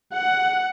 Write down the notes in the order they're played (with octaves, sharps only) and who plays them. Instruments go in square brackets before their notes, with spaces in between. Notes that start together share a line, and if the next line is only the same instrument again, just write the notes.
[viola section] F#5